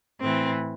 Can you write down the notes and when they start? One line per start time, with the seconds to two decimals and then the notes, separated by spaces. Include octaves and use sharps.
0.20 A2 E3 C4